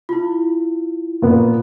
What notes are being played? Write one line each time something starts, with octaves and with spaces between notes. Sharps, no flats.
E4 F4
A#2 B3